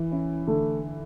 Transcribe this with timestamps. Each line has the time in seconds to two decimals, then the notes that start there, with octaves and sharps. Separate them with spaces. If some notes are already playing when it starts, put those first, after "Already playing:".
Already playing: E3
0.11 C#4 E4
0.47 D3 A3